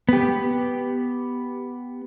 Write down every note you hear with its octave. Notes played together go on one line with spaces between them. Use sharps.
B3 G4